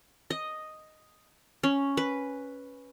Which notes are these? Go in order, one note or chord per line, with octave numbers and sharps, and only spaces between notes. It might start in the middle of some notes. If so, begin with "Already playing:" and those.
D#5
C#4
B4